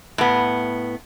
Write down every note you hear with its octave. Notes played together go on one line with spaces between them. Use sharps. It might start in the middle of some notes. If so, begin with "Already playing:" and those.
A2 B3